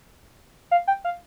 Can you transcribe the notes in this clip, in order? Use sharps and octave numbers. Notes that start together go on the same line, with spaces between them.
F5
G5
F5